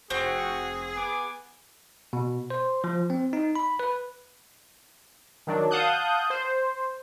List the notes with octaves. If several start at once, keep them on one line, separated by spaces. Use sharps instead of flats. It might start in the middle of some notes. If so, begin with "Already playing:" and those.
F1 C4 F#4 G#4 F#5 C#6
B3 G#5 D6
B2
C5
F3
C4
D#4
B5
B4
D#3 F#3 D4
F5 F#5 A5 D#6 F#6 G6
C5